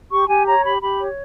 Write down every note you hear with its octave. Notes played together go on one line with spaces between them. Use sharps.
G4 C#6
G4 G#5
C#5 A#5
G4 B5
G4 B5
C#5